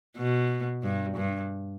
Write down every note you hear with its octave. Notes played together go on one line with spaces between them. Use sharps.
B2
G2
G2